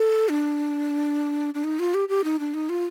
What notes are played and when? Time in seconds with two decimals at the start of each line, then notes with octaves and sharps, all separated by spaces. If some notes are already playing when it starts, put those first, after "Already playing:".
Already playing: A4
0.29 D4
1.54 D4
1.64 D#4
1.79 F4
1.94 G4
2.09 G4
2.24 D#4
2.39 D4
2.54 D#4
2.69 F4